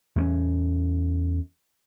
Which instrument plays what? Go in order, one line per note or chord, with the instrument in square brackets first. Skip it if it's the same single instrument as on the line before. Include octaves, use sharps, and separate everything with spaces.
[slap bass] E2 A3 C#4